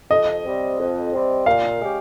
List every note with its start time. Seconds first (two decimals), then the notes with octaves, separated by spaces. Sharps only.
0.10 F2 D#5
0.45 C3 G3 C4
0.79 F2
1.13 C3 G3 C4
1.46 A#2 F5
1.80 G#3 C#4 G4